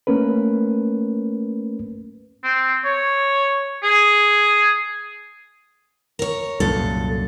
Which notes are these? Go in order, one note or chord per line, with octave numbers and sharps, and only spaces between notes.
A3 A#3 C#4 A#4 B4
C4
C#5
G#4
A#4 C#5
C2 F#2 A#2 A4